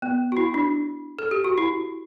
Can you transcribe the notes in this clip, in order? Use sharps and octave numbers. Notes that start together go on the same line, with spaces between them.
B3
F#4
E4
D4
A4
G4
F#4
E4